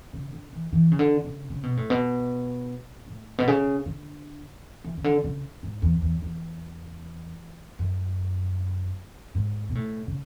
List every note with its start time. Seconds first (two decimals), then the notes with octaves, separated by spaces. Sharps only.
0.13 C#3
0.33 D3
0.53 E3
0.73 E3
0.92 C#3
0.99 D3
1.24 C#3
1.50 C#3
1.63 B2
1.77 A2
1.90 B2
3.08 A2
3.38 B2
3.47 C#3
3.86 D3
4.84 E3
4.97 C#3
5.04 D3
5.24 C#3
5.63 G#2
5.82 E2
6.02 E2
6.22 E2
7.79 F#2
9.35 G#2
9.69 B2
9.75 A2
10.08 C#3